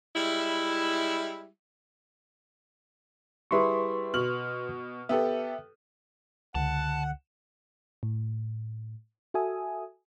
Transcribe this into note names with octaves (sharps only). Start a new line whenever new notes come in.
G3 G#3 E4
G3 E4 G#4 B4 C6 C#6
B2 F6 F#7
B3 G4 A4 E5
C#2 D3 F#5 A5
A2
F#4 A4 E5 G#5 D#6